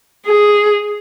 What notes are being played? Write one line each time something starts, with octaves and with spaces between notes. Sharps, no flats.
G#4